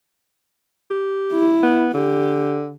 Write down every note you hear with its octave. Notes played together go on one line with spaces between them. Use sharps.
G4
E4
B3
D3 G4